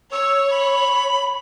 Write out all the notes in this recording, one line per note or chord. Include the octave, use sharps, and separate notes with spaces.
C#5 E6
B5